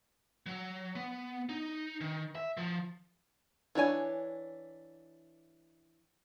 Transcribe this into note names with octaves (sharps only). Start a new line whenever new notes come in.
F#3
B3
D#4
D#3
E5
F3
E3 D4 C#5 G#5